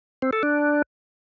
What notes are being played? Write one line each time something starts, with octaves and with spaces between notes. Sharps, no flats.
C4
A4
D4